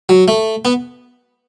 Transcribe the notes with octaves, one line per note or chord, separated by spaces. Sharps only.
F#3
A3
B3